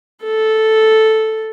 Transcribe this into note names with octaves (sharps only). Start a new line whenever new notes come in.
A4